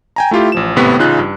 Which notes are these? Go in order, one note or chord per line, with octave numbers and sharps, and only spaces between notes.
G5 G#5 A#5
A3 E4 F4 G4
A1 F3 E7
G#1 A2 C3 B3 C#6 B6
A1 C#3 D#4 F4 F#6
G2